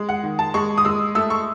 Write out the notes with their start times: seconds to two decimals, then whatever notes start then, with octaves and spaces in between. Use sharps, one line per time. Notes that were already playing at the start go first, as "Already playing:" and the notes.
Already playing: G#3
0.09 F#5
0.23 D#3
0.39 A5
0.54 G#3 C#6
0.78 D#6
0.85 G#3 E6
1.15 A3 E6
1.30 C#6